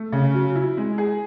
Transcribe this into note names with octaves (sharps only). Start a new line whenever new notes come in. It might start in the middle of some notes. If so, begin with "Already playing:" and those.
Already playing: A3
C#3
F#3
E4
G#3
G#4